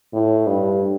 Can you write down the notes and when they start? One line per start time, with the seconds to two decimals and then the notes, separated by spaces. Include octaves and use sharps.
0.14 A2
0.47 G2